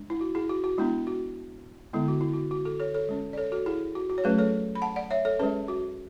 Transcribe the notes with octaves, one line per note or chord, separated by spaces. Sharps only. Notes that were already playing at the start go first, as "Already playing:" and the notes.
Already playing: G#3 D4
E4
F#4
E4 G#4
F#4
F#4
G#3 B3 D4 E4
F#4
D3 G#3 B3 E4
F#4
E4
F#4
F#4
F#4 A4
A4 C#5
A4 C#5
G#3 C#4
D5
A4 C#5
F#4 A4
E4 G#4
F#4
F#4
C#5
F#3 A3 C#4 G#4 B4
A4 C#5
B5
F#5 A5
D5 F#5
C#5 E5
A4 C#5
G#3 C#4 G#4 B4
F#4